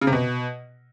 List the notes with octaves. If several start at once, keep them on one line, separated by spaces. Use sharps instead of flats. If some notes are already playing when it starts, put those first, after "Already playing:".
C#3
C3
B2